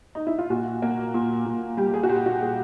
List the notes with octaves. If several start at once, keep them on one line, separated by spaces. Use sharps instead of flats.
D#4
E4
F4
A#2 F#4
A#3
A#2
A#2
G3 G4
G#4
F#4
A#2 G4
F#4
A#2 G#4